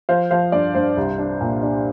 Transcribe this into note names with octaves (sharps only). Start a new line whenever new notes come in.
F3 C5 F5
F3 C5 F5
G2 D5
G2 C5
C2
D4
A#2
D4